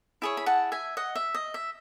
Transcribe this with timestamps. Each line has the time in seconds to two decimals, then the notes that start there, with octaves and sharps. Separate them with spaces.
0.22 E4 G#4 C#5
0.37 B5
0.46 F#5 A5
0.72 E5 G#5
0.97 D#5 F#5
1.15 E5
1.35 D#5
1.54 E5